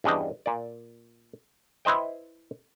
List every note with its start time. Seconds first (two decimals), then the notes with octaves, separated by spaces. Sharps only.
0.04 E2 G2 C#4 D4 D#5 G5
0.46 A#2 D5
1.85 E4 B4 C5 D#5 G5